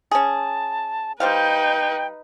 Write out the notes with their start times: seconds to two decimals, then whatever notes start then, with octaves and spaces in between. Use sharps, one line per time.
0.11 C#4 G#4 A5
1.20 G3 D#4 B4 C5 F5 G5